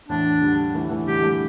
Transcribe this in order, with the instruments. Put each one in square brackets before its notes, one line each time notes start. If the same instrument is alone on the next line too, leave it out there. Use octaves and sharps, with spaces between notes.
[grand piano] E2 A2 [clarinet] D4
[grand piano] D3 G3
E3 A3
E3 A3
[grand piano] D3 G3 [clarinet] G4
[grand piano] E3 A3